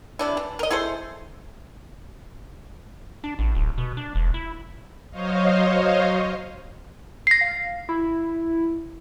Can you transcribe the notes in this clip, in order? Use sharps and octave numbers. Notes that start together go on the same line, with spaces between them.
C3 D4 E4
E3
A#4 D#5
E4 G#4 A4 C5
D4
A1
D1
B2
D4
E1
E4
F#3 C5 C#5 D#5 F5
A#6 C7
F5
E4